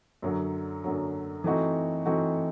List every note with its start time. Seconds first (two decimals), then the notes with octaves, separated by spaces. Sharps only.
0.22 F#2 D3 F#3
0.84 F#2 D3 F#3
1.44 E3 A3 C4 D#4 F#4
2.06 E3 A3 C4 D#4 F#4